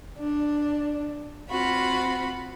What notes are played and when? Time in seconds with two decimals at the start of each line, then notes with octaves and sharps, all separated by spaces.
0.18 D4
1.49 C4 F4 F#4 B5